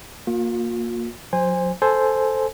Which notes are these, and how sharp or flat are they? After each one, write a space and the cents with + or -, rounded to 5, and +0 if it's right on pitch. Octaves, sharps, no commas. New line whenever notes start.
A#3 +0 F4 +40
F#3 -35 C5 +0 G#5 -25
A4 +0 C5 +0 G#5 +15